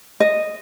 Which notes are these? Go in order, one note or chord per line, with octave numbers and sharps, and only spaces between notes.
D#5